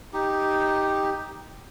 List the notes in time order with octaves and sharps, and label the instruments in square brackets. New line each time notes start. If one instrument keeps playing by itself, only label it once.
[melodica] D#4 G4